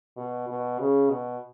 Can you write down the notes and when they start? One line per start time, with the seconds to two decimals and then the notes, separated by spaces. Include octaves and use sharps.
0.17 B2
0.48 B2
0.79 C#3
1.10 B2